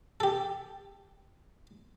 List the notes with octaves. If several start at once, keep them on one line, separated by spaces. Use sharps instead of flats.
G4 A4